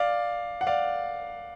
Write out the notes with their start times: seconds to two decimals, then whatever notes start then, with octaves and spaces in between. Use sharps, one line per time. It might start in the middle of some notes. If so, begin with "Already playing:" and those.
Already playing: D5 F5
0.61 F#5
0.67 D5 F5